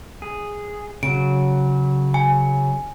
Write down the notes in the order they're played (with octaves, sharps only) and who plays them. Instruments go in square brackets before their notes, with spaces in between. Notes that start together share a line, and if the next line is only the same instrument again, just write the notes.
[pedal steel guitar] G#4
[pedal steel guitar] C#3 F#3 [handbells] D7
[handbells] G#5